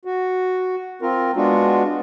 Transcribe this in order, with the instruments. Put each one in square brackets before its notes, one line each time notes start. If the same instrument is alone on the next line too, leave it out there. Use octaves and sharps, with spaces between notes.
[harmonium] F#4
C4 F4 A#4
G#3 B3 D4 F4 F#4